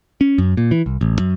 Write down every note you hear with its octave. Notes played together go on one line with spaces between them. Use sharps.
C#4
F#2
A#2
E3
C2
A1
F#2